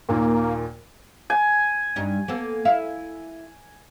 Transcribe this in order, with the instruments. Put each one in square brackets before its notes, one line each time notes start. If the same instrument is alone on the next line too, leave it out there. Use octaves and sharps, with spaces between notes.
[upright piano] D#2 A#2 [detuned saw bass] A#3
[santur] G#5
[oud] G2 G3 D#4
A#3 B3 A4
E4 E5 F5